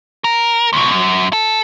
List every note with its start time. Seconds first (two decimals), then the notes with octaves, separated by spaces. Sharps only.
0.24 A#4
0.73 C#2 B2
0.91 F#2
1.33 A4